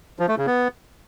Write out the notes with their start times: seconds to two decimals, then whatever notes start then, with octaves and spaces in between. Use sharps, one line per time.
0.19 F3
0.28 A3
0.38 C#3
0.47 B3